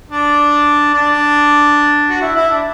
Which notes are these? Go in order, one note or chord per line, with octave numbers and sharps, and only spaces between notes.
D4
D4
F#4
E4
E4
D4